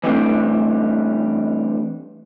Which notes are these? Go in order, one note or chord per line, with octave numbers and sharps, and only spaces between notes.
E3 G3 A3 C4 D4